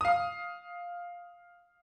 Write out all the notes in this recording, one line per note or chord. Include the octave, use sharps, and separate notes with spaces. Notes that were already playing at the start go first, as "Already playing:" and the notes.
F5 D#6